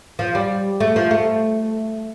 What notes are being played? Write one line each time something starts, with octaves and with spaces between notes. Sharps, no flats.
F3
G3
A3
F3
A3